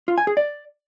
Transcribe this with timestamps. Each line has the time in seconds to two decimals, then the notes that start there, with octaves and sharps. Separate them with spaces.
0.08 F4
0.18 G#5
0.27 G#4
0.37 D5